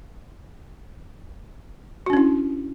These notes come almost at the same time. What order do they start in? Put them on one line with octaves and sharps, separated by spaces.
F#4 D4 C#4 E4